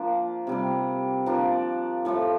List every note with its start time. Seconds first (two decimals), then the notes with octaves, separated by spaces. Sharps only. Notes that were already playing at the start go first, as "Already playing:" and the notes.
Already playing: F3 A#3 D4
0.47 C3 G3 D4
1.26 F3 A#3 D4
2.05 A2 F3 A3